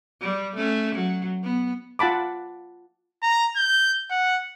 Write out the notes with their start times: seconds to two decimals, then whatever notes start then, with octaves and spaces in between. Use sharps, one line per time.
0.21 G3
0.56 A3 C#4
0.96 F#3
1.43 B3
1.99 F4 F#5 A5 B5 D6
3.22 A#5
3.56 G6
4.11 F#5